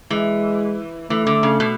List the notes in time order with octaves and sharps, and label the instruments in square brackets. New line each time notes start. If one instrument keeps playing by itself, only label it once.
[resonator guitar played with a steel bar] E3 [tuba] G#3
[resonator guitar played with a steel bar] E3 [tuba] A3
[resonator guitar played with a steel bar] D3
C#3
B2